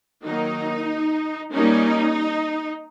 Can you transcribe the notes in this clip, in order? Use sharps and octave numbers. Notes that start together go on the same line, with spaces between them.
D#3 F#3 A#3 D#4
G3 A#3 C#4 D#4